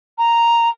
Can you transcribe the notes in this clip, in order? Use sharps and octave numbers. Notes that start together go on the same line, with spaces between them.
A#5